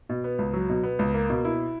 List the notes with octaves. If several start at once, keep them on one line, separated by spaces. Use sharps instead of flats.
B2
B3
C#2
F#3
B2
B3
C#2
A#3
B2
E4